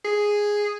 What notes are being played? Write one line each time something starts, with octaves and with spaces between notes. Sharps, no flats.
G#4